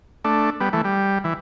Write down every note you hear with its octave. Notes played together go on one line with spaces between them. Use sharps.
A3 D4
G3 B3
E3 A3
G3
E3